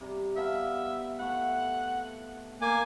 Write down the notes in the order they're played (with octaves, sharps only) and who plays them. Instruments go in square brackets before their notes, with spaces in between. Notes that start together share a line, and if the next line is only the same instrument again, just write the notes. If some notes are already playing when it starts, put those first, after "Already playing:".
[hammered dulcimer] C3 G3 A#5
[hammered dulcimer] B3 F5 A5 [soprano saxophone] E5
[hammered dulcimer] A3 E4 [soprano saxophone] F#5
[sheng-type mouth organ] A#3 G#5 [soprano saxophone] D6